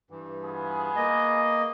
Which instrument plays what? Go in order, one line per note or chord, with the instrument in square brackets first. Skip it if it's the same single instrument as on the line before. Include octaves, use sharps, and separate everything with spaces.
[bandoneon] G2 E3
[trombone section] B3 F4 G#4
[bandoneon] A#3 D#5